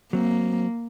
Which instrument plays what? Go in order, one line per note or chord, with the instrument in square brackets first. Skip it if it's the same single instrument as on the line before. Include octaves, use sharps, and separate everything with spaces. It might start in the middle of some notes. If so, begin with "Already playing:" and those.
[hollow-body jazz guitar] F#3 C4 [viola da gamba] A#3